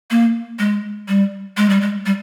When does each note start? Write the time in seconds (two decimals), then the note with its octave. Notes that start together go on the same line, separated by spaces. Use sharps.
0.11 A#3
0.59 G#3
1.08 G3
1.57 G#3
1.70 G3
1.81 G#3
2.06 G3